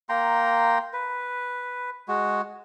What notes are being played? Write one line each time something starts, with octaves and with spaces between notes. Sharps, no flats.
A#3 G5 A#5 C6
B4
G#3 F#4